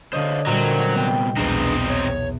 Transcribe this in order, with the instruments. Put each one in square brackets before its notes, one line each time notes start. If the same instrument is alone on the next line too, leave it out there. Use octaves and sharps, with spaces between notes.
[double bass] D3 [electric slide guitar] C5 C#5 F5 [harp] D#5
[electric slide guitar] F#2 C5 A#5 [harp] A#2 G3 [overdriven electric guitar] F#3
[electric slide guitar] C3 B3 [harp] G5
[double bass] B1 E2 [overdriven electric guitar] C4 D#4 [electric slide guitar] D4 G#4 B4
[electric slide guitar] C#5